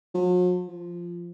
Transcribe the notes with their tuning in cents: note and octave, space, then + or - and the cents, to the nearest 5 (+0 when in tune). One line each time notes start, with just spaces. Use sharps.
F#3 -45
F3 -5